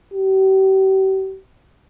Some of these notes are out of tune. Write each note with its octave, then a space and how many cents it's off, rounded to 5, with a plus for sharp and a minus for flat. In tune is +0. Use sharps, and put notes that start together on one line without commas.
G4 -40